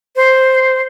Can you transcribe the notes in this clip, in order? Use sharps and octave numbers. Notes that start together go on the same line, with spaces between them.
C5